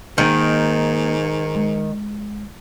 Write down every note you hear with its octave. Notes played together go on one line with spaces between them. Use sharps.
G#2 D#3 A#3
G#3